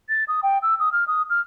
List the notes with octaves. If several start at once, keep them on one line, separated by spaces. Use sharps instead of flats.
A6
D#6
G5
E6
D#6
F6
D#6
F6